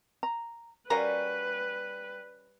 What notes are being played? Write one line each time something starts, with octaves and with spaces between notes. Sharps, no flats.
A#5
G3 C#4 F#4 A#4 B4 F5 F#5 A#5